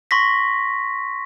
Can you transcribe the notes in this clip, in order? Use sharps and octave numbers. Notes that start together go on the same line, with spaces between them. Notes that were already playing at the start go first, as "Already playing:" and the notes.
C6 C#6 A#6 B6